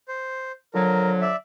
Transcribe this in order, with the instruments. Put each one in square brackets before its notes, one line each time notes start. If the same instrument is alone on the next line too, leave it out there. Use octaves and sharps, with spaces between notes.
[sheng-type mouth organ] C5
[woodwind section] D3 F3 F#3 [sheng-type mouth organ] A#4
[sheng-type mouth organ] D5 E5